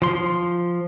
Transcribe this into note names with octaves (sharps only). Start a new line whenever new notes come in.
F3 C6